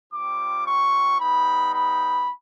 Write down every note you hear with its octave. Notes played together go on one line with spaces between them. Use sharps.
G3 C4 F4 D6
C#6
G3 B3 D#4 B5
B5